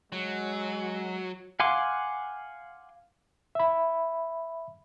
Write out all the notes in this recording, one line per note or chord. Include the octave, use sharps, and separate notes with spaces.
F#3 G#3
F5 F#5 G#5 C6 D6
E5 B5